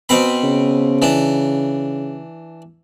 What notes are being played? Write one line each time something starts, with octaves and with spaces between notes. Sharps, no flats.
B2 C4 B5
C#3
E3 D4